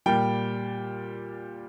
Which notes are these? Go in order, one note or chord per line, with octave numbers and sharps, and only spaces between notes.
A#2 G3 G5